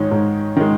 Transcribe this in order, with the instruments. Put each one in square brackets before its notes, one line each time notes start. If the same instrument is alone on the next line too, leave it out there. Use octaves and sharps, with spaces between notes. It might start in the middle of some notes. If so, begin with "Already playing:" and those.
Already playing: [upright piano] G#2 D#3 G#3 C#5
G#2
D#3 G#3